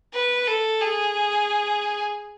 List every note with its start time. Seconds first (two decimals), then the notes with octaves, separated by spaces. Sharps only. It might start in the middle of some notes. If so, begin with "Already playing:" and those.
0.14 B4
0.48 A4
0.81 G#4